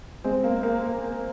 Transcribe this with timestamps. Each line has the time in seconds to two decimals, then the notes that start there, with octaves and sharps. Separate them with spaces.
0.24 G#3 C4
0.44 A#3
0.63 A#3
0.82 A#3